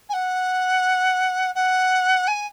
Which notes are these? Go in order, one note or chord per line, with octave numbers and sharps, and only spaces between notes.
G#5
F#5
F#5
G#5